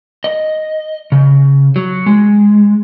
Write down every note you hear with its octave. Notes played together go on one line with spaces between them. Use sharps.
D#5
C#3
F#3
G#3